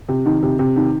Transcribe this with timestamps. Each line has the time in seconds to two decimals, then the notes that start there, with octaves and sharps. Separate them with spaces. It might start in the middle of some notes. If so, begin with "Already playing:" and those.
0.09 C3
0.26 D#3
0.43 C3
0.59 C3
0.76 D#3